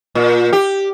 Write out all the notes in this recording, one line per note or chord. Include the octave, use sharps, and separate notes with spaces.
A#2
G4